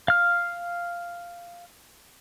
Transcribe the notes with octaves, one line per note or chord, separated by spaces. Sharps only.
F5 F6